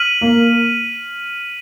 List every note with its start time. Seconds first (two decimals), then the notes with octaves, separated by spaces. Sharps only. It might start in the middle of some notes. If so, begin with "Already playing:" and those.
Already playing: F6 B6 D#7 F#7
0.21 A#3